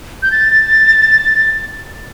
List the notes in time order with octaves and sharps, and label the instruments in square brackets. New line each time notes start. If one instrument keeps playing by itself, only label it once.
[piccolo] G6
A6